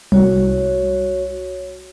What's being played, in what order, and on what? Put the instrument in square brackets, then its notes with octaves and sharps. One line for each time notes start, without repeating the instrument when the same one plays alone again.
[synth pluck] C2 [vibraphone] F#4 C#5